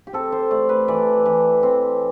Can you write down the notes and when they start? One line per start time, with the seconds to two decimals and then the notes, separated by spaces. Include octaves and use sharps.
0.07 G4
0.13 C4 A4
0.32 C5
0.51 A3 D5
0.69 B4
0.88 E3 D5
1.26 E3
1.63 C4